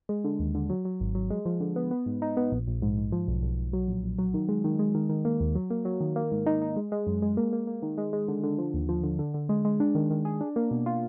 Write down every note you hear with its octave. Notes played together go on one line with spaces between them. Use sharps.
G#3
D3
D#2
D3
F#3
F#3
G#1
F#3
G#3
F3
D3
B3
B3
G#2
D#4
B3
A#1
A#1
G#2
G#2
F3
B1
B1
B1
F#3
A#1
A#1
F#3
D#3
G#3
D#3
G#3
D#3
D#3
A#3
D#2
F#3
A#3
F#3
D#3
A#3
G#2
D#4
D#4
G#3
G#3
F#2
G#3
A#3
A#3
A#3
D#3
G#3
G#3
D3
D3
F3
D#2
F3
D3
D3
D3
G#3
G#3
D4
D#3
D#3
G#4
D4
A#3
B2
F4